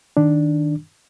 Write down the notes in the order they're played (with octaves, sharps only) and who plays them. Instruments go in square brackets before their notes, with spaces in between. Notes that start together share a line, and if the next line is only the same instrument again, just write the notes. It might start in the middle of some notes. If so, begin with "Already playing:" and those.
[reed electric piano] D#3 D4